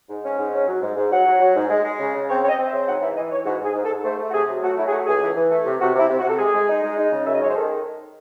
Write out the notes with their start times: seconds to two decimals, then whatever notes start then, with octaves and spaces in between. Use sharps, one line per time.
0.09 G#2
0.23 C#4
0.38 G#2
0.52 C#4
0.67 F#3
0.81 G#2
0.96 G#2
1.11 F#3 F#5
1.26 F#3
1.40 F#3
1.55 G#2
1.69 G#3
1.84 G#3
1.99 C#3
2.14 C#3
2.28 C4 C#5
2.42 C4 C#5
2.48 D#5
2.58 C4
2.67 E5
2.72 C#3
2.87 G#2 F#5
3.01 E3 E5
3.16 E3 D#5
3.31 E3 C#5
3.45 G#2 F#4
3.60 G#2 G#4
3.75 G#2
3.85 A4
3.90 G#2
4.04 A3 C5
4.19 A3
4.29 F#4
4.33 C3 G#4
4.48 F#3
4.62 A3 F#4
4.77 F#3 E4
4.87 G#4
4.92 A3 F#4
5.06 C#2 G#4
5.21 E3
5.35 E3
5.50 A3
5.65 C3
5.79 C3 F#4
5.95 C3 E4
6.09 C3
6.19 F#4
6.24 C3 A4
6.38 G#3 G#4
6.53 G#3
6.68 D#4
6.82 G#3
6.97 D#4
7.11 C#3
7.26 F#2 E5
7.34 D#5
7.41 G#3 C#5
7.48 C5
7.55 D#3 A4